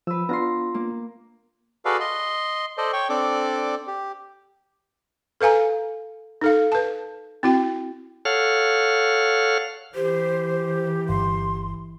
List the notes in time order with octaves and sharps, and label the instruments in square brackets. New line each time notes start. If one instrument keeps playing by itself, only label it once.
[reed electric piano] F3 [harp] B4 E6
[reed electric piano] B3 D4 F4 [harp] A#5 C6
[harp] A#3
[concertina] F#4 G#4 A4 B4 D5 F5
D#5 C6
A4 C5 D5 D#5
C#5 G5 C#6
C4 D4 A4 D5 D6
G4
[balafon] A4 B4 F5 G#5 A#5
D#4 A4 F5
B4 A5
C4 E4 F#4 G5
[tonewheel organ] A4 C#5 F5 F#5 F6
[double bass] E3 [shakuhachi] G4 [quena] C5
[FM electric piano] G1 [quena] C6